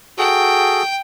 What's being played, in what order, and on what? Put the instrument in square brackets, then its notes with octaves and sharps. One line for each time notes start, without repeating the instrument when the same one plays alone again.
[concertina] F#4 G#4 A4 [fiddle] G5